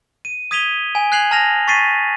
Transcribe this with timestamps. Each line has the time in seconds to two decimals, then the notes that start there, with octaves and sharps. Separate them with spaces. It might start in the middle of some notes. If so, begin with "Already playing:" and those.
0.25 D#7
0.51 D#6 G#6 B6 D#7 F7 G7
0.95 G#5
1.12 F#6 G#6 C7 F7 F#7
1.31 A5 F6 A#6 F7
1.68 C#6 A6 B6 C7 D#7